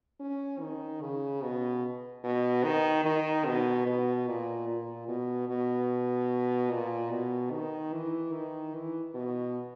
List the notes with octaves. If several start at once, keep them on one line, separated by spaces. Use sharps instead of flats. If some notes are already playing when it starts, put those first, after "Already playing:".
C#4
D#3
C#3
B2
B2
D#3
D#3
B2
B2
A#2
A#2
B2
B2
A#2
B2
D#3
E3
D#3
E3
B2